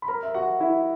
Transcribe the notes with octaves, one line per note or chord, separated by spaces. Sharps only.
B5
A#4 A#5
E5
F#4 F#5
E4 E5